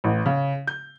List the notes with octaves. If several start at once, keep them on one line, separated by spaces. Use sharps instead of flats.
A1
C#3
G6